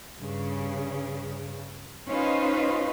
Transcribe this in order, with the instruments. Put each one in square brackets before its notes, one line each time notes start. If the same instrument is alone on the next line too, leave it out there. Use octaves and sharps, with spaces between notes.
[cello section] G2 C#3
C#4 D#4 F4 B4 C5